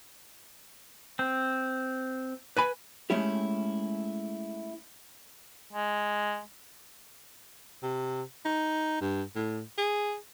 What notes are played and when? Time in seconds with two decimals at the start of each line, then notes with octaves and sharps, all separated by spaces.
1.19 C4
2.57 B4 G#5 B5
3.10 G#3 A3 C#4 E4 G4
5.73 G#3
7.83 C3
8.45 D#4
9.01 G2
9.36 A2
9.78 G#4